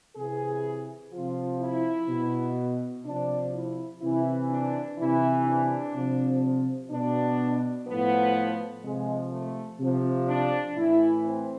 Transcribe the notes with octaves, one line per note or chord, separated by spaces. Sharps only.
C3 E3 G#4
C3 F3 F4
E4
B2
C3 F3 D4
E4
C3 E3 E4
D4
C3 E3 E4
D4
C3 F3
B2 D4
A2 F3 B3
C3 F3 G#3
A3
C3 F3
D4
A2 E3 E4
C4